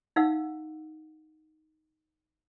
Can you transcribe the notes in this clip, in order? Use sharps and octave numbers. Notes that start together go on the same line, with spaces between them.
D#4 F5 F#5 E6